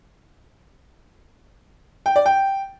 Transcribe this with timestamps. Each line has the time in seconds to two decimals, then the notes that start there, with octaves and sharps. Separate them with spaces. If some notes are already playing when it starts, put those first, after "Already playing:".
2.06 G5
2.16 D5
2.26 G5